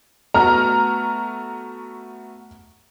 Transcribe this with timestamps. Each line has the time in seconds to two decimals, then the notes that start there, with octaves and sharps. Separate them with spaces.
0.34 A3 B3 F#4 A#5 F6